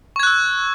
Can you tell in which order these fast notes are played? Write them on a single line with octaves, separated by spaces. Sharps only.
C#6 G#6 F#6 E6